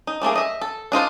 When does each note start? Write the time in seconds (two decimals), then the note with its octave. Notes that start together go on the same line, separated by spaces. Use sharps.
0.07 D#4
0.22 G3 A3 A#3 G#4
0.36 D#5 E5
0.61 A4
0.92 D4 D#4 F4 C5